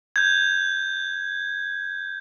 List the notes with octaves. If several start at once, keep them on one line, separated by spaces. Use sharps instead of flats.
G6 G#6